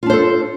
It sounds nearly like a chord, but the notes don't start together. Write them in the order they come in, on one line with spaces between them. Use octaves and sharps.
F4 D4 C5 A4